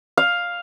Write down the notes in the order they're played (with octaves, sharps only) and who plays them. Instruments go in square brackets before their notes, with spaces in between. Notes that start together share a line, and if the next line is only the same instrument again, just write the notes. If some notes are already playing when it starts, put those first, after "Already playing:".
[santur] F5